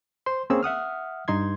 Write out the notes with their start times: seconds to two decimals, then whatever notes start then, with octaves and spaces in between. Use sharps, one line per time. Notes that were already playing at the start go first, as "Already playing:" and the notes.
0.26 C5 C6
0.50 A#3 C4 C#4 G#4 E6
0.63 E5 F#5 D#6 F6
1.28 G2 D#4 C6 G#6